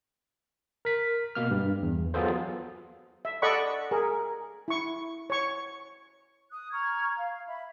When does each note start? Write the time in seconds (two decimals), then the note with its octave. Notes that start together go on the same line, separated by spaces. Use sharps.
0.85 A#4 B6
1.35 B2 A#3 F6
1.51 G2
1.82 E2
2.14 F#3 B3 F4 G#4 A4 C5
3.25 E5
3.42 A4 D5 D#5 F#5 B5 C#6
3.91 G#4 A#4
4.68 E4 C#6
5.30 C#5 C#6
6.51 D#6 F#6
6.72 A#5 C#6 F6 G#6
7.16 F5
7.47 E5 B5